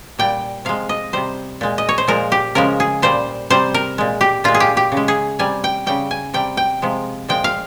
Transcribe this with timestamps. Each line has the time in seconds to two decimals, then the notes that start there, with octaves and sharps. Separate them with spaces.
0.19 A#2 G3 G5
0.65 C3 F3 G#3 F5
0.89 D#5
1.13 C3 G3 C5
1.61 A#2 G#3
1.78 D#5
1.89 C#5
1.98 C5
2.08 A#2 F3 G#3 A#4
2.32 G4
2.55 C#3 F3 G#3 A#4
2.80 G#4
3.02 A#2 G3 C5
3.50 C3 G3 C5
3.74 A#4
3.98 A#2 G#3
4.21 G4
4.44 A#2 G#3 F4
4.55 G#4
4.60 G4
4.77 G4
4.92 C#3
4.97 G#3
5.08 G#4
5.39 C3 G3 G#5
5.64 G5
5.86 C#3 G3 G5
6.11 G#5
6.34 C3 G3 G5
6.57 G5
6.82 C3 F3 G#3
7.28 A#2 F3 G#3 G5
7.44 F5